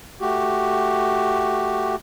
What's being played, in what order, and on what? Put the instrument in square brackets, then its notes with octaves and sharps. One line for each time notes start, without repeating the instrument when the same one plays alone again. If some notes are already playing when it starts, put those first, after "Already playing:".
[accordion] A3 F#4 G4